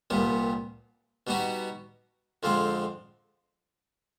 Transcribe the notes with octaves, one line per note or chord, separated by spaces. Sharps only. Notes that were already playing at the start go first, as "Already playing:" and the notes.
C2 A#2 G3 B3
B2 G3 B3 D#4 F#4
F2 D3 F3 G#3 C4